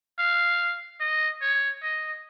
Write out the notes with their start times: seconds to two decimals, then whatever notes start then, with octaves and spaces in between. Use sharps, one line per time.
0.19 F5
1.00 D#5
1.41 C#5
1.82 D#5